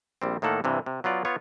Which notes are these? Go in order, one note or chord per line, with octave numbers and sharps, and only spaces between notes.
A#1 G3 C4
A2 D#3 A#3 A4 F#5
G2 C3 E3
C3
F#3 B3 F4 D5
B3 F4 C#5